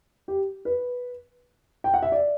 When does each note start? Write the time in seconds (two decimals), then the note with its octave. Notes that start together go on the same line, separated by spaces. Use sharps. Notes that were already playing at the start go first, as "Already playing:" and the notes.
0.28 G4
0.65 B4
1.84 G5
1.94 F#5
2.02 E5
2.12 D5